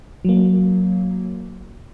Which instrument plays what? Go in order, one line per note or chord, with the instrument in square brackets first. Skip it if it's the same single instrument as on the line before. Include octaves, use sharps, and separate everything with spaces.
[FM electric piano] F#3 A#3